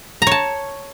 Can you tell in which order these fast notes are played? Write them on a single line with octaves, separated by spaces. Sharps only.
A#5 C#5 A5